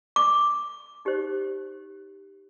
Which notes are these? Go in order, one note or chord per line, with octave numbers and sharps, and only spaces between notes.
D6
D#4 G4 C5